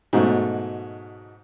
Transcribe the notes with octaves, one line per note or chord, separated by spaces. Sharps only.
G#2 B2 F#3 A3